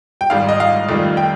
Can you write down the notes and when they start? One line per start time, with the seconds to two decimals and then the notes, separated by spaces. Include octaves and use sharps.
0.21 G5
0.30 G#1 G#2 G3 F5
0.49 D#5
0.60 F5
0.89 F1 F2 D#3 G3
1.17 G5